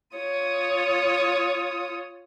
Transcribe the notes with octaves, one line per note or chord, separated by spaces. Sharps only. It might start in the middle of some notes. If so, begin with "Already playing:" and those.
F4 C#5 D#6